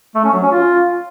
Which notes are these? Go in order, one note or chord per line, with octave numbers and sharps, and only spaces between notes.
A3
C#4
F#3
C#4
F4